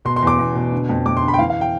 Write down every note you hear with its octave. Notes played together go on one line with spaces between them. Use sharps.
B2 C6
C6
E2 D6
E2
B2
D3
F2
F2 D6
C6
D3
B5
G5
E3 F5
F5
G5